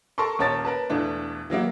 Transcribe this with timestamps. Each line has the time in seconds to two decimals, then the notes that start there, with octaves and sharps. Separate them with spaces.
0.18 A4 A#4 A5 C6 C#6
0.39 D#1 C#4 A#4 C#5 A5 A6
0.65 A#4 B4 A5
0.90 E1 E3 A3 D4
1.50 E3 F#3 A#3 E4